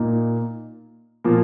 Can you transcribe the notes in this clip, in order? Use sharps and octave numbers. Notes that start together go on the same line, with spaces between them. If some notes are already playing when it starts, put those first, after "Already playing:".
Already playing: A#2 A#3 D#4
A#2 F3 A#3